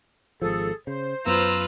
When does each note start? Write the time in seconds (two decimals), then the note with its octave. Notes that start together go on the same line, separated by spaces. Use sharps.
0.42 G#1 F3 G#4 A4
0.87 C#3 C5
1.26 F#2 B3 F4 B4 A#5 E6